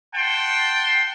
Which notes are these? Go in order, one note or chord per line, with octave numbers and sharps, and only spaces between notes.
F#5 G5 A5 C6